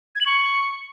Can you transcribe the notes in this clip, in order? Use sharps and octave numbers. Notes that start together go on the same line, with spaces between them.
G#6
F#7
C#6